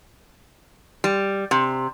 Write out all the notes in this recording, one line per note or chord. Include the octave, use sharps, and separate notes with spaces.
G3
C3